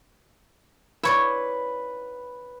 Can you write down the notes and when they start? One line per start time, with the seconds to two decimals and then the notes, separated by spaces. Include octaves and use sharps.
1.03 E4 B4 C#5 D5